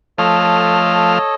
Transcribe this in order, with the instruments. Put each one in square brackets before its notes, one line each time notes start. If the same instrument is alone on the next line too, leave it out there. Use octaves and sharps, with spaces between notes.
[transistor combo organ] F3 A3 F5 [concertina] A4 C#5 D#5